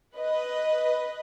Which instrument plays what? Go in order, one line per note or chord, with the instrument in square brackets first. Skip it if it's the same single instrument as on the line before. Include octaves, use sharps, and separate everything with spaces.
[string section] B4 D#5